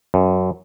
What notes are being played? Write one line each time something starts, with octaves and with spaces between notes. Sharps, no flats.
F#2